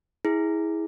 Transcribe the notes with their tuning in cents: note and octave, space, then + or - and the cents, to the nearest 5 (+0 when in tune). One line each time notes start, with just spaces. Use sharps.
E4 -25 G#4 +0